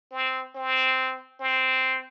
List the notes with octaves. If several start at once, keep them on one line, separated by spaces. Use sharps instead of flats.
C4
C4
C4